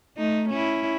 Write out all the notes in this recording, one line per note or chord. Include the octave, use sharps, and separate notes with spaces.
A3 D#4
C#4 E4